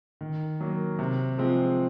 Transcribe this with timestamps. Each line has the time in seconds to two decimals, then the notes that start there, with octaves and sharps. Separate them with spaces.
0.21 D#3
0.60 F#3 A#3
0.99 C3
1.38 F3 G#3 C4